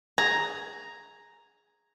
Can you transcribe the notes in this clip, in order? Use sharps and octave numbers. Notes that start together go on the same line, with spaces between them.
G#4 A#5